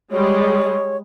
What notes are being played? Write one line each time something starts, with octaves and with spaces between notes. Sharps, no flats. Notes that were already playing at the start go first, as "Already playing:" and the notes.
G3 G#3 C#5